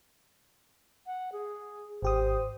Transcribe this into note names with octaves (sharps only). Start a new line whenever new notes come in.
F#5
G#4
G#1 G4 C5 D#6